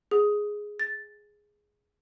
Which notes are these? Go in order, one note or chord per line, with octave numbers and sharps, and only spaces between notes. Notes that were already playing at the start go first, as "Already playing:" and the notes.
G#4
A6